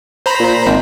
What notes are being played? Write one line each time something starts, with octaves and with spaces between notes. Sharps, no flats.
C5 A#5 B5
A#2
G#1